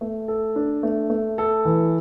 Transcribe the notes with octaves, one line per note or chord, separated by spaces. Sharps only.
A3
A4
D4
A3
A3
A4
E3